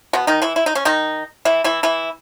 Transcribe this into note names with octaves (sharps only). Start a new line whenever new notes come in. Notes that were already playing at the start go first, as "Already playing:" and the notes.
B2 B3
D#3 D#4
E3 E4
E4
D#4
C#4
D#3 D#4
E3 E4
E3 E4
E3 E4